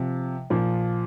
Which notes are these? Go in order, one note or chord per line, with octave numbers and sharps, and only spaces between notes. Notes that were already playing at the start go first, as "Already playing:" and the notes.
Already playing: C3 F3
A#2 F3